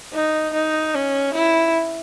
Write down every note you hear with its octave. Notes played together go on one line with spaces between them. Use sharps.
D#4
D#4
C#4
E4